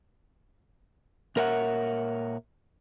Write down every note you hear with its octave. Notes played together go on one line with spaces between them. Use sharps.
A#2 A#4 C#5 E5 F#5